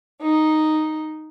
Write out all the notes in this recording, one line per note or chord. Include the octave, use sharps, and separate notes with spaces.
D#4